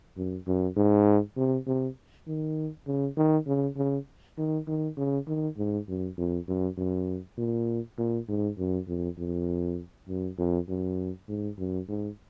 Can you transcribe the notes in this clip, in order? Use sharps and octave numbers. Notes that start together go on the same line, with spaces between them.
F#2
F#2
G#2
C3
C3
D#3
C#3
D#3
C#3
C#3
D#3
D#3
C#3
D#3
G#2
F#2
F2
F#2
F#2
A#2
A#2
G#2
F#2
F2
F2
F#2
F2
F#2
G#2
F#2
G#2